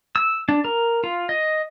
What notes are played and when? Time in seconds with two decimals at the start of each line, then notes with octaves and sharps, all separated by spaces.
0.16 E6
0.49 D4
0.65 A#4
1.04 F4
1.29 D#5